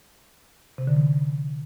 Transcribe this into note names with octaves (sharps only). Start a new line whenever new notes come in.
C3
D3
E3